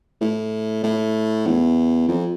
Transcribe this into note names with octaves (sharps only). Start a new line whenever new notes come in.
A2
A2
E2
F2